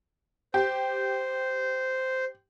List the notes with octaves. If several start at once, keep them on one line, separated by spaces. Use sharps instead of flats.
G4 C5